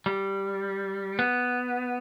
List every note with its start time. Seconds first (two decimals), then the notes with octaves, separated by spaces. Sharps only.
0.06 G3
1.19 B3